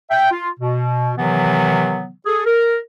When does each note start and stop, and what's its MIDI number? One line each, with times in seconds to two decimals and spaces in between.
0.11 0.29 76
0.11 0.29 79
0.31 0.49 65
0.60 1.11 47
1.18 2.11 48
1.18 2.11 51
1.18 2.11 52
1.18 2.11 54
1.18 2.11 59
2.26 2.43 68
2.26 2.43 69
2.45 2.77 70